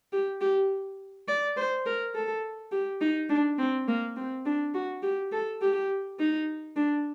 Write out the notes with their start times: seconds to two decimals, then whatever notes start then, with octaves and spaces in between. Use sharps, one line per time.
0.12 G4
0.41 G4
1.28 D5
1.57 C5
1.86 A#4
2.15 A4
2.72 G4
3.01 D#4
3.29 D4
3.59 C4
3.88 A#3
4.17 C4
4.46 D4
4.74 F#4
5.03 G4
5.32 A4
5.61 G4
6.19 D#4
6.76 D4